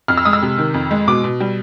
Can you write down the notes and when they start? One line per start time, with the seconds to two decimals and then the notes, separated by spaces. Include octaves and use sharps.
0.08 F2 F6
0.17 E6
0.25 G#3 D#6
0.33 E6
0.42 C3
0.58 D#3
0.74 F2
0.91 G#3
1.07 B2 D6
1.24 B2
1.40 G3